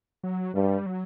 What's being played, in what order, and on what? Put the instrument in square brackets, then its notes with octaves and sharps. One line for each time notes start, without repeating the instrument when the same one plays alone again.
[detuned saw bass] F#3
[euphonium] G2 [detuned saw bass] G3
[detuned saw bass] F#3